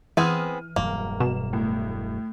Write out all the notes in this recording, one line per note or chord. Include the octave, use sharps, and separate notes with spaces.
E3 B3 C4 G#4 F6 D#7
E1 G2 F#3 A#3
B2 E7
A2